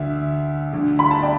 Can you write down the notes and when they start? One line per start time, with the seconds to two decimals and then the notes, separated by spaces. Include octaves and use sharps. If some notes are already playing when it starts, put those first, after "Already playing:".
Already playing: D2 D3 E5
0.72 D2 D3
0.99 B5
1.11 A5
1.23 D5 G5